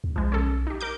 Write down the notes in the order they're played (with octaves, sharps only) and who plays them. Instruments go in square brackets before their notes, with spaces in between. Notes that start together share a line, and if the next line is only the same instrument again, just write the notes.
[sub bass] D#2
[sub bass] B1 [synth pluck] F3 G#3
[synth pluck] C#4 G#4 A4
D#4 G4
A#4 D6 G6